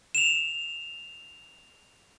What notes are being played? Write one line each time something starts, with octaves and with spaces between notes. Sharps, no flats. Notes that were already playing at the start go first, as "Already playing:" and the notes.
E7 F7